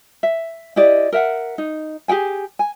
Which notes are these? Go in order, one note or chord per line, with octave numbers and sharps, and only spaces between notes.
E5
E4 G4 D5 D#5
A#4 E5 F#5
D#4
G4 G#4 G5 G#5
G#5